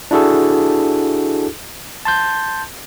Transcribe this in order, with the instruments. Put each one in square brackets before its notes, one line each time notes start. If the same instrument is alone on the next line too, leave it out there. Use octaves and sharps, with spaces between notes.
[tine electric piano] D4 E4 F#4 G#4 A4
A5 C6 G6